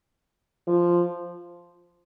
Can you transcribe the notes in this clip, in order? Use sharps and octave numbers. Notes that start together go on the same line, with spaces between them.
F3